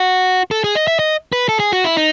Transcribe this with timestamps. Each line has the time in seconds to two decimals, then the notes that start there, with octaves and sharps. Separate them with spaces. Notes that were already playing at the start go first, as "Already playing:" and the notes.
Already playing: F#4
0.51 A4
0.64 G#4
0.75 D#5
0.88 E5
0.99 D#5
1.33 B4
1.49 A4
1.60 G#4
1.73 F#4
1.84 E4
1.97 D#4